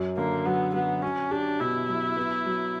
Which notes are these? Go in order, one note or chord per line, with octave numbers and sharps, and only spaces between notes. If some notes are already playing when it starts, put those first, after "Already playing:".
Already playing: F#2 F#3
D3 A#3
F#3 B3
F#3 B3
F#3 C#4
D4 G4
B2 E4
F#3
B3
F#3